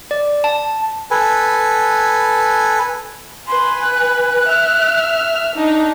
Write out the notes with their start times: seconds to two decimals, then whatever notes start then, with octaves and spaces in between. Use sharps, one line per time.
0.11 D5
0.44 A5
1.11 A4 B4 G#5
3.48 B4 G#5 C6
3.81 F#6
4.46 E5 F6
5.55 D4 D#4